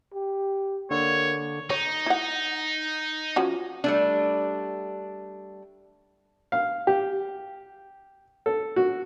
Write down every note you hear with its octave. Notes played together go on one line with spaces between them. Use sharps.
G4
D3 A#3 C#5
D#4 C#5
E4 F#5
F3 C#4 F#4
G3 A3 D4
F5
G4
A4
F#4